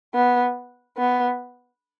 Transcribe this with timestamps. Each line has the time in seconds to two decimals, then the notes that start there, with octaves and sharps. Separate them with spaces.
0.14 B3
0.98 B3